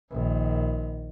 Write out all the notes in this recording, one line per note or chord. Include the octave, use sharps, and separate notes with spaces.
A#1 D#3